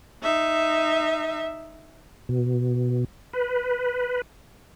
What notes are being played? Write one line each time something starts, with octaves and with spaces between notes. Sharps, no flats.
D#4 E5
B2
B4